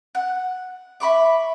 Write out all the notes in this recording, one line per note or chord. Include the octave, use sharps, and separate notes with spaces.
F#5
E5 B5 C#6 D6